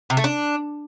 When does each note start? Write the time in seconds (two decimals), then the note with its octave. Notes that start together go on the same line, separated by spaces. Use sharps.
0.10 C3
0.17 A3
0.24 D4